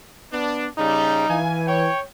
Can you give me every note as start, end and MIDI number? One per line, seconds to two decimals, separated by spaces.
0.32 0.67 59
0.32 0.67 62
0.78 1.26 49
0.78 1.26 55
0.78 1.38 63
1.29 1.87 52
1.29 1.62 77
1.29 1.62 80
1.68 2.00 73
1.68 2.01 79